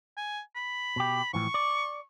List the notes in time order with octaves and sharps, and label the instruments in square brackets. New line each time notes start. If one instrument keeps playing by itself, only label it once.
[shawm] G#5
B5
[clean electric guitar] B2 G4
[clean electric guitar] A2 E3 F3 [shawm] C#6
[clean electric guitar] D5